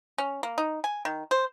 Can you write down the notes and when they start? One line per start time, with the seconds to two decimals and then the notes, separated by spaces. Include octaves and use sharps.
0.18 C#4
0.43 A#3
0.58 D#4
0.84 G#5
1.05 D#3
1.31 C5